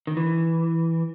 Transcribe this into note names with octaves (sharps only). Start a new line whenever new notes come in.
D#3
E3